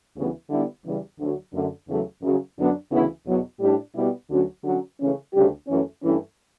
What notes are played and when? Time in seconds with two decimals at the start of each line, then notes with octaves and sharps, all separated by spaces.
0.16 D2 C#3 E3 G3 B3
0.50 D3 G3 B3 E4
0.85 E2 C#3 G3
1.19 D2 D3 F#3
1.54 F#2 D3 A3
1.88 E2 C#3 F#3 A3
2.23 F#2 C#3 F#3
2.58 F#2 D3 F#3 B3 D4
2.92 D2 C#3 E3 B3 E4
3.26 E2 B2 F#3
3.61 A2 G3 D4 G4
3.95 B2 G3 B3 E4 G4
4.29 D2 D3 F#3 C#4 F#4
4.64 D3 F#3 C#4 F#4
4.99 C#3 E3 A3 C#4
5.33 D2 C#3 G3 D4 G4
5.68 F#2 E3 A3 C#4
6.03 G2 E3 A3 C#4 E4